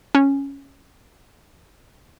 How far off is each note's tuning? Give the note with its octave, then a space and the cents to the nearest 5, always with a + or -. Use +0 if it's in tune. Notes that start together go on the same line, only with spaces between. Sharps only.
C#4 +0